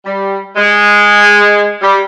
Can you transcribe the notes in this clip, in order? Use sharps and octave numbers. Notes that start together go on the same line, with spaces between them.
G3
G#3
G3